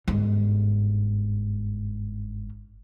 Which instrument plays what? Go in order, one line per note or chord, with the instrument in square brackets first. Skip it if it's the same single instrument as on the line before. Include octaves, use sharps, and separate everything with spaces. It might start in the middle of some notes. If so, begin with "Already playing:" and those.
[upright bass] G1 G#2